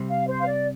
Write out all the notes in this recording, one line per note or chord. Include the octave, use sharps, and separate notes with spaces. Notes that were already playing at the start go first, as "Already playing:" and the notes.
Already playing: C3 G3 C4
F5
C5
F5
D5